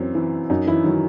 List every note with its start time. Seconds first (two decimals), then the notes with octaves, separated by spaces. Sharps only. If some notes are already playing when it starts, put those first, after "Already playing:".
Already playing: F#2 E3 C4
0.15 E3
0.50 F#2 D#4
0.67 E3 E4
0.84 D#3 F#3